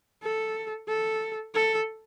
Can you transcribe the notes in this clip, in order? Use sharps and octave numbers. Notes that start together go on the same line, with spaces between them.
A4
A4
A4